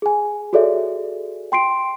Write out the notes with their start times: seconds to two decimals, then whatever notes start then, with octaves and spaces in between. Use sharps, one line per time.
0.02 G#4 G#5
0.53 F#4 G#4 A4 C#5 D5 E5
1.52 G5 C6 C7 D7